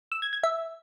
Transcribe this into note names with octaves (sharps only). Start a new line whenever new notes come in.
E6
G#6
G#6
E5